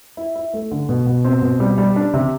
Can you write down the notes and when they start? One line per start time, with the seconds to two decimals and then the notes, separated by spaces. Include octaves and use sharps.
0.17 E4
0.36 E4
0.53 A3
0.71 D3
0.89 B2
1.07 B2
1.24 C4
1.42 B2
1.60 G3
1.78 G3
1.96 D4
2.14 C3